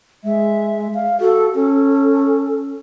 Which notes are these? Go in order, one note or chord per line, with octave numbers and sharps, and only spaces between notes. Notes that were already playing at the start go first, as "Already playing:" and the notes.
G#3 E5
F5
F#4 A4
C#4 A4